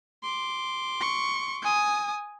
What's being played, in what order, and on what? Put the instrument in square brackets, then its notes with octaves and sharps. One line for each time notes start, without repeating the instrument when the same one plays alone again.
[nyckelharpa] C6 D6
[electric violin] C#6
G#5 D#6